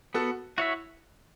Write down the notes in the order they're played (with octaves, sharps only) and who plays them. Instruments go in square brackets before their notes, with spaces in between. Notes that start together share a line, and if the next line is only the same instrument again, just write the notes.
[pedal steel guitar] B3 [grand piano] F#4 A4
[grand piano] E4 [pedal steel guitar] F#4 C#5 E5